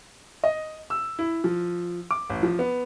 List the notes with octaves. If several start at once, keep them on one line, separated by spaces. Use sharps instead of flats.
D#5
E6
E4
F3
D6
A1
F3
B3